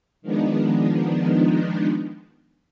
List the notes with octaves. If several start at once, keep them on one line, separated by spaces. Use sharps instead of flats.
D#3 F3 G#3 B3 D4 D#4